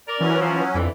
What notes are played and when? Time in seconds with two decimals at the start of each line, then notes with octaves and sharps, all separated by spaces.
0.08 A#4 D5
0.20 E3 F#3 C#4
0.41 F3
0.74 F2 D3 E3